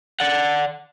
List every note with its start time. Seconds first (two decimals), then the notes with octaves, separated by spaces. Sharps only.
0.20 D5 F#5